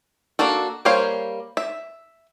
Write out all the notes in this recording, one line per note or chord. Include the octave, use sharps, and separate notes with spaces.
A#3 D4 F#4 A4
G3 A#3 C5 C#5 F5
E5